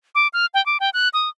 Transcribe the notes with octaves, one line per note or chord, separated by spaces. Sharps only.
D6
F6
G5
D6
G5
F#6
D#6